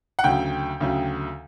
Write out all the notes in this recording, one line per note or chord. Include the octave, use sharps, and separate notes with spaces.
F#5
D2 C#3 F#3 G5
D2 C#3 F#3